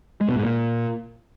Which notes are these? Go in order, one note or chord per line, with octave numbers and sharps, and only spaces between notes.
G#3
B2
G#2
A#2